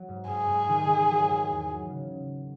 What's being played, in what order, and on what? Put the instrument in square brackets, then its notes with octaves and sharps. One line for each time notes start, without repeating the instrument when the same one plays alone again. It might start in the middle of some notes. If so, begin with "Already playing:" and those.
Already playing: [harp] F#3
G#2
[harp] G#2 [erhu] G#4
[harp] G#2
D#3
D#3
F#3
G#2
E2
F#3
C#3